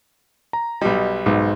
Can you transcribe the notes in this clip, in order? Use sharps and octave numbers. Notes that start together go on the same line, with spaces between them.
A#5
B1 G3 D#5
B1 G#2